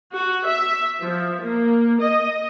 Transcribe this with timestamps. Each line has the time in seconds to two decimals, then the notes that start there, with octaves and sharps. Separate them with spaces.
0.15 F#4
0.47 E5
1.02 F3
1.42 A#3
2.00 D#5